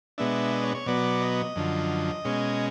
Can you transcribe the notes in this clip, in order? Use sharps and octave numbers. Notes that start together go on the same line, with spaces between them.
B2 G#3 B3 D4 E5
D#5
C#5
C#5
B2 F#3 B3 D5
D#5
F#2 D3 F3
B2 G#3 C#4